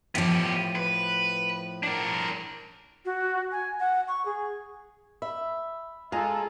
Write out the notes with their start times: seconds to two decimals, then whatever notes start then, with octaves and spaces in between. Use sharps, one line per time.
0.15 A2 F3 B3 G4
0.75 B4
1.83 D4 A#4
3.05 F#4
3.51 G#5
3.79 F#5
4.07 C#6
4.25 G#4
5.22 E5 B5
6.12 G#3 F4 G#4 A4 F5 G#5 A#5